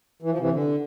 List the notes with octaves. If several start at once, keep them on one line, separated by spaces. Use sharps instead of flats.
E3
F3
C3 E3
D3